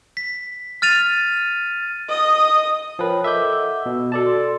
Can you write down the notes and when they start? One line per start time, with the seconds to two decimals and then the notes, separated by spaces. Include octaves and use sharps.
0.17 B6
0.82 F6 A6 D#7 F7
2.09 D#5 D#6
2.99 F3 A#4 B4 C#5 G5
3.24 A4 D#5 E5 D6 G6
3.53 F#5 E6
3.86 B2
4.12 F#4 A4 D5 A5
4.26 C6